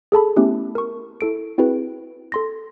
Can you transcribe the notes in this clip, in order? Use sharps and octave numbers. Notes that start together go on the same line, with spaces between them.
G#4 A4 A5 B5
A3 B3 C#4 E4 G4
A#4 C#6
E4 A4 D7
C4 E4 F#4 G#4 B4
A4 C6 A#6